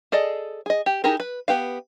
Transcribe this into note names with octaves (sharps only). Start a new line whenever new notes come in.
G#4 A4 D5 D#5
G#4 D#5
G4
D#4 E4 G4 G#4 A#4
B4
B3 G4 B4 F5